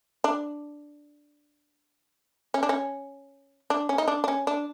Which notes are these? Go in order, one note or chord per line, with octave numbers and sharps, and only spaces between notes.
D4
C#4
D4
C#4
D4
C#4
D#4
D4
D4
C#4
D4